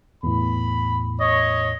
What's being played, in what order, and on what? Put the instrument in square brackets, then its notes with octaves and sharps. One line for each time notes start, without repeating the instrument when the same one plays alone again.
[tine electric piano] E2 A2 [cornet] B5
[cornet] C#5 [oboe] D#5